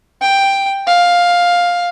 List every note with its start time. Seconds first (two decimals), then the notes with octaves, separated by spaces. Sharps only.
0.21 G5
0.87 F5